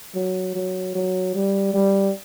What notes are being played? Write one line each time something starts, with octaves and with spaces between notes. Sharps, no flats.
F#3
F#3
F#3
G3
G3